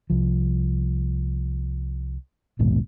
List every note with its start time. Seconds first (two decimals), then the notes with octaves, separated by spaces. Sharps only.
0.10 C2 F3
2.59 A#1 D#2 G#2 B2